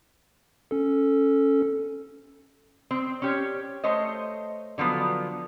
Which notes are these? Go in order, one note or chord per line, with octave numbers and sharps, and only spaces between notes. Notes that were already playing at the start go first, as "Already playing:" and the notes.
C#4 A4
C4
C#4 G4 C#5
A3 C5 C#5 D#5
D3 F3 F#3 B3